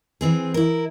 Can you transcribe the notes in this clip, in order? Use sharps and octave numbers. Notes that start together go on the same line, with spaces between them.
E3 C4 G#4
E4 A#4